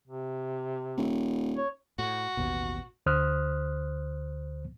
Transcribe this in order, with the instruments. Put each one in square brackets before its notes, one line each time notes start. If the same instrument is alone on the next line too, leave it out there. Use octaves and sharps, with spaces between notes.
[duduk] C3
[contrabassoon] D#1
[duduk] C#5
[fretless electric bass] A2 [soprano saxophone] F#4
[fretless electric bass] A1 D#2 B2
[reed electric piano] D2 D3 C5 D#6 F6 F#6